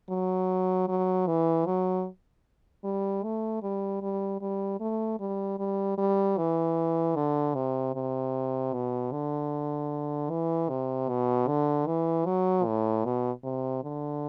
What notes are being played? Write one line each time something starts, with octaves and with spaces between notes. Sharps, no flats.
F#3
F#3
E3
F#3
G3
A3
G3
G3
G3
A3
G3
G3
G3
E3
D3
C3
C3
B2
D3
E3
C3
B2
D3
E3
F#3
A2
B2
C3
D3